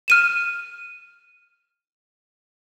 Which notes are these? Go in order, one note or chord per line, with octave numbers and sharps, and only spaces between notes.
F6 D#7 E7